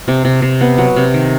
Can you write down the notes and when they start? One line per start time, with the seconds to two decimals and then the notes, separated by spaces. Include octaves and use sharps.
0.08 C3
0.25 C3
0.42 C3
0.61 B3
0.78 F#3
0.96 C3
1.14 D#3